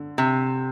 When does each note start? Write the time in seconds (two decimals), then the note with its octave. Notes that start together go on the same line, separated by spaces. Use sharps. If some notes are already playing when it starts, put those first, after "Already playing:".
Already playing: D3
0.18 C3